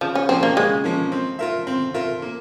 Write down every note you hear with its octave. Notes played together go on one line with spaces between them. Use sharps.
C#3 F3
C#4
F3 A#3 C4 C#4
A#3
C#3 G#3
F3 A#3 C#4
C4
F4 A#4 E5
C4
F4 A#4 E5
A#3